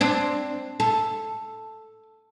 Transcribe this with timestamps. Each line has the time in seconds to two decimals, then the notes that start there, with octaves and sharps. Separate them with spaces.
0.01 C4 D4
0.80 A4